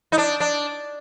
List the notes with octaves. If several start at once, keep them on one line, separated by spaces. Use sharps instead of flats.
D#4
D4
D4